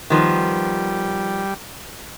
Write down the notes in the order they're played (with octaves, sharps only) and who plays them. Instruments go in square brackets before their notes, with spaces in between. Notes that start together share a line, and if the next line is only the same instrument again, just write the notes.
[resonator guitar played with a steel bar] D#3 F3 B3 [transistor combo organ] G3